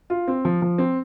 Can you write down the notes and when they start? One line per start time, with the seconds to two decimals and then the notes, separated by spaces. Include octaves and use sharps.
0.10 F4
0.28 C4
0.45 F3
0.62 F3
0.78 C4